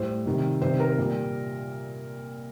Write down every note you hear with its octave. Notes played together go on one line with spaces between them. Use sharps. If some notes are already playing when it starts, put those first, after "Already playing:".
Already playing: A2 G3 C5
C3 D#3 G3
C3 D#3 G3 C5
A#4
A#2 G3